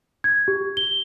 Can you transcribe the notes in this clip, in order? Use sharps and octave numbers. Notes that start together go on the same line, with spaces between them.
G#6
G4
G7